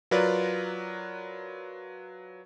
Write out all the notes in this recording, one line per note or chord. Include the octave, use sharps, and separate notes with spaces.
F#3 F4 A#4 B4 D5